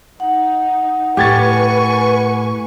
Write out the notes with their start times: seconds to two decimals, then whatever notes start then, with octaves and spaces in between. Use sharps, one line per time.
0.20 D#4 F#5
1.17 A2 G4 B4 G#5 C#6 G#6 A6